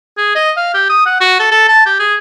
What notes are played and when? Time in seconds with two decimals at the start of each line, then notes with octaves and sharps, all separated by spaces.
0.18 G#4
0.35 D#5
0.57 F5
0.74 G4
0.90 D#6
1.06 F#5
1.21 F#4
1.40 A4
1.51 A4
1.68 A5
1.86 G4
2.00 G#4